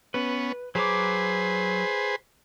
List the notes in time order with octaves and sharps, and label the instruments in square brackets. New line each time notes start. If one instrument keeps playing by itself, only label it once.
[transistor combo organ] B3 C#4 [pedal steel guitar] B4
[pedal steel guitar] F#3 A#5 D6 [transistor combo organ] G#4 B4 C5